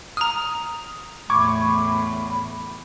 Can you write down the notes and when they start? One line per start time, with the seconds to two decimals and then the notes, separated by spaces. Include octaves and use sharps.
0.17 A#5 D#6 F6
1.30 E2 A2 B5 C#6 D6 G#6